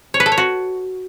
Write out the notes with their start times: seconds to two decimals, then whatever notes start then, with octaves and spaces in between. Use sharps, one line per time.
0.14 C#5
0.20 B4
0.26 A4
0.32 C#5
0.38 F#4